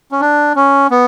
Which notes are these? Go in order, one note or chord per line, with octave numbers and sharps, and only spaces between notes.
C#4
D4
C#4
B3